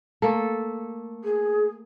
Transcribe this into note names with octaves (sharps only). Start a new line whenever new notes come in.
A3 A#3 A4
G#4